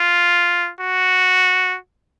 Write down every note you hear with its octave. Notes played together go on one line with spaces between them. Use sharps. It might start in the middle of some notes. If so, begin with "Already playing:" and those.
Already playing: F4
F#4